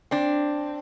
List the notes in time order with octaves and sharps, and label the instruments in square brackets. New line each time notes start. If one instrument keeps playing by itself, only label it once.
[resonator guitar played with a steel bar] C4 D4